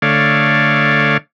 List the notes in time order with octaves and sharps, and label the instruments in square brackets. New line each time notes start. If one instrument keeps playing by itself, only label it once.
[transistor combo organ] D3 A3 C#5 D5 F5